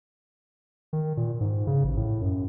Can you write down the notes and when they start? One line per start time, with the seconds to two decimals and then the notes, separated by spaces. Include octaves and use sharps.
0.93 D#3
1.17 A#2
1.41 G#2
1.67 C#3
1.84 A1
1.97 A2
2.21 F#2